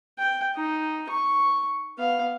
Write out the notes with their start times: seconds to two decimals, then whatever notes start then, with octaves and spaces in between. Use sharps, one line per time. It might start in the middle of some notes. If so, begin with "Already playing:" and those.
0.19 G5
0.55 D#4
1.09 C#6
1.98 B3 F5